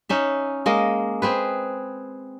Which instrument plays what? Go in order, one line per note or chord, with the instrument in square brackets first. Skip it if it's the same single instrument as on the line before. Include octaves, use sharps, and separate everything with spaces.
[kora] C#4 D#4 E5
G#3 A#3 D#5
C4 G#4 B4